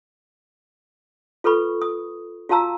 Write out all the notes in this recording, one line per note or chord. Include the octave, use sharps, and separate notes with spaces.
F4 A4 B4 B5 C#6
D#6
F4 F#4 F5 A5 A#5 E6